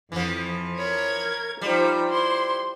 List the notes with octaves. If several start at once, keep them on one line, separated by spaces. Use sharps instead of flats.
F2 E3 F3
A#4 C#5 B5 G#6
F3 G3 D#4 C5 G5
E4 C5 C6